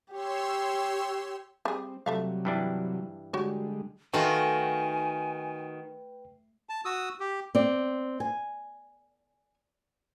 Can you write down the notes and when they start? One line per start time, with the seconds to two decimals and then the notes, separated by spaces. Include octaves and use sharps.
0.12 G4 C#5 C6 E6
1.65 G3 C4 G#4
2.06 C3 F#3 G3 A3 E5 F5
2.45 G2 E3 D4
3.33 D3 G3 G#3 F#4 G4 C#5
4.14 D#3 A3 F4 F#4 B4 G5 G#5
6.69 A5
6.85 F#4 D#6 E6
7.20 G4
7.55 C4 D5
8.20 G#5